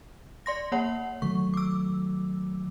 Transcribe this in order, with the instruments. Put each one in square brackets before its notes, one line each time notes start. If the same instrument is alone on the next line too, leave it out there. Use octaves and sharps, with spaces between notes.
[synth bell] D5 C6 A#6
A#3 C#5 F#5
[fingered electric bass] D#3 F#3 A3 [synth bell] C#6
[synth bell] D6 E6